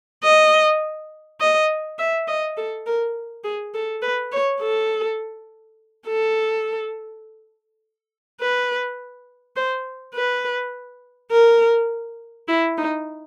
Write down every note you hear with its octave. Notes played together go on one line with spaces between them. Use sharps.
D#5
D#5
E5
D#5
A4
A#4
G#4
A4
B4
C#5
A4
A4
B4
C5
B4
A#4
E4
D#4